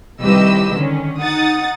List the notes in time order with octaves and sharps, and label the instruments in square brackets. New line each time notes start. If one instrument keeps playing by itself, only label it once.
[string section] C2 D#3 G4 B4 D#5 E6
D3 D#3 C#4
D#4 F#5 D#6 A6